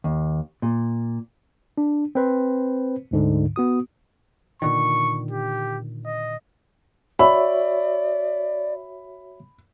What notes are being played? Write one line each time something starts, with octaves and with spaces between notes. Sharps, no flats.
D#2
A#2
D4
C4 B4 C5
D2 G#2 D3
B3 F#4 D#6
A#2 D3 D#3 C#6
G4
D#5
F#4 C#5 D5 E5 B5